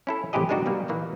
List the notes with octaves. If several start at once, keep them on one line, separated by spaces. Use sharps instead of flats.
C#4 E4 A4
A1 C3 E4 G4 G#4 D#5
G#3 B3 D4 D#4 F#4 G4
B2 G3 A#3
A#2 D#3 E3 A#3